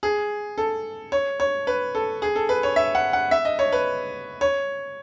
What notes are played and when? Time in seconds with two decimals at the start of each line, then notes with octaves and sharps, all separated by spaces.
0.03 G#4
0.58 A4
1.12 C#5
1.40 C#5
1.67 B4
1.95 A4
2.22 G#4
2.36 A4
2.49 B4
2.63 C#5
2.76 E5
2.95 F#5
3.13 F#5
3.31 E5
3.45 D#5
3.59 C#5
3.72 B4
4.41 C#5